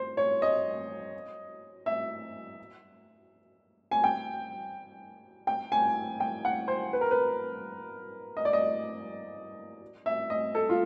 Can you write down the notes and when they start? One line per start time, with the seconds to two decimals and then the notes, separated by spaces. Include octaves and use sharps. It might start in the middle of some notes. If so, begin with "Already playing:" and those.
Already playing: C5
0.17 C#5
0.42 D#5
1.86 E5
3.91 G#5
4.04 G5
5.47 G5
5.72 G#5
6.20 G5
6.45 F#5
6.68 C5
6.93 B4
7.01 A#4
7.11 B4
8.37 D#5
8.45 D5
8.53 D#5
10.06 E5
10.30 D#5
10.55 A4
10.69 F4